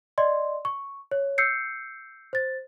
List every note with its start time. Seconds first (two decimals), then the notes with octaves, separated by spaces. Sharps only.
0.18 D5 D#5 C6
0.65 C#6
1.11 C#5
1.38 E6 G6 C7 C#7
2.33 C5 A6